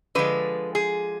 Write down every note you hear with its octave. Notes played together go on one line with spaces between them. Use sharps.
D3 F3 G#3 B4
G#4